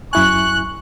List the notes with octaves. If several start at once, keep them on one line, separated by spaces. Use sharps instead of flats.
F#2 E4 G#5 C#6 F#6